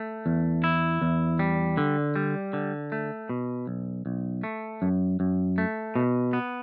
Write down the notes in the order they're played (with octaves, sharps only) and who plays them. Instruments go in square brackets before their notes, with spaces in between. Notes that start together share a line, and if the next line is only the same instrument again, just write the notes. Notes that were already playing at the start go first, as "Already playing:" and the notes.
Already playing: [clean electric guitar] A3
E2
E4
E2
G3
D3
G3
D3
A3
B2
B1
B1
A3
F#2
F#2
A3
B2
B3